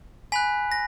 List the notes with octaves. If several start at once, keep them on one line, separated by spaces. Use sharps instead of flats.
G#5 B5 F#6 B6
A#6